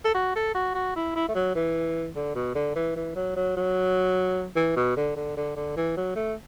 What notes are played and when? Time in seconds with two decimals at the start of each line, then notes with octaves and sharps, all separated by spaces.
0.05 A4
0.15 F#4
0.36 A4
0.55 F#4
0.75 F#4
0.96 E4
1.16 E4
1.29 A3
1.35 F#3
1.55 E3
2.16 D3
2.35 B2
2.55 D3
2.76 E3
2.96 E3
3.16 F#3
3.36 F#3
3.57 F#3
4.56 E3
4.76 B2
4.97 D3
5.16 D3
5.37 D3
5.56 D3
5.77 E3
5.97 F#3
6.16 A3